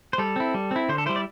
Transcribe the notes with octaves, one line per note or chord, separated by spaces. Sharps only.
C5
G3 A4
C4 E4
G3
C4 E4
D3 C5
A4
G3 E4 C5
D5